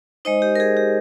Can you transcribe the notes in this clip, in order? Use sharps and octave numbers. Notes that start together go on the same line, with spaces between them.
G#3 D#4 C5 D#5
G4
A#4
G#4
G4